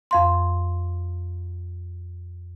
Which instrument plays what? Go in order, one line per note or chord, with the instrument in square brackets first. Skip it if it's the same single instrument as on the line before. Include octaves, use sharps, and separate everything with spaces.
[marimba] F2 F5 C6